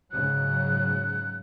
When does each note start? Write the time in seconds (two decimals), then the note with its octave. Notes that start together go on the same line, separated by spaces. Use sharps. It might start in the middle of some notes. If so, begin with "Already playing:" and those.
0.12 G#2 C#3 F#3 F#6